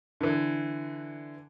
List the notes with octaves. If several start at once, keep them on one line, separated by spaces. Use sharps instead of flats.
D3 E3